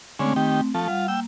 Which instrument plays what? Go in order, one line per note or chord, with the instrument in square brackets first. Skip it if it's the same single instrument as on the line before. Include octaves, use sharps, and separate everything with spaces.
[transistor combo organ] D3 G#3 C#4 [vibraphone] A3 C4
[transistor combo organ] D#3 G4
F3 A3
[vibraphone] G3 F#5 [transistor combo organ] F4
[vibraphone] A#3 [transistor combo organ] G5 E6